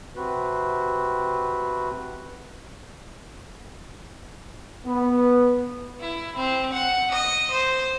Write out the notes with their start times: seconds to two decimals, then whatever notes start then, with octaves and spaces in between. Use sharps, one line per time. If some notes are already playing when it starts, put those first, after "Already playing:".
0.16 C3 C4 F#4 B4
4.86 B3
6.00 E4
6.36 C4
6.72 F#5
7.11 D#5
7.51 C5